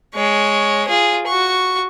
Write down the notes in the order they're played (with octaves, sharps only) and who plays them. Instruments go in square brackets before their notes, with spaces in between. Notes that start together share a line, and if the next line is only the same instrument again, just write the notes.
[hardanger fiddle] G#3 C#5
F4 G#4
F#4 C#6